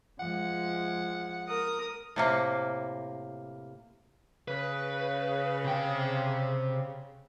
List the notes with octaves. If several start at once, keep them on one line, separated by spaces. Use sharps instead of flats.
F3 G#3 F#5
A#4 D#6
A2 C3 A#3
C#3 B4
C3 G5